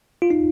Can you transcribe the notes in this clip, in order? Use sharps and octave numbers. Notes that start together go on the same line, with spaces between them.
F4
D#4